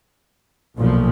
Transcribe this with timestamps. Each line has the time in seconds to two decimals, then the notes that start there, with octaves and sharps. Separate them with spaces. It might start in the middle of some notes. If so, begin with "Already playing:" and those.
0.76 B1 A#2 F3